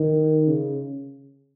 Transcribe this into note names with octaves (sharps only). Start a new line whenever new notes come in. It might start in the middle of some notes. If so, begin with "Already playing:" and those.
Already playing: D#3
C#3